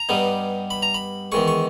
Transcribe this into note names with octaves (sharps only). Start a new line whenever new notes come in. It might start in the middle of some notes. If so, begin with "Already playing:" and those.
Already playing: A#5
G2 G3 B3 D#4
B5
A#5
B5
E2 D#3 G#3 C#6
C#6